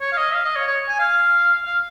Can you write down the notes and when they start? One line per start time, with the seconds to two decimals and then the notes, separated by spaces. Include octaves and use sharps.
0.01 C#5
0.12 F5
0.17 D#5
0.34 F5
0.45 D#5
0.56 C#5
0.67 C#5
0.89 G#5
0.99 F5
1.66 F5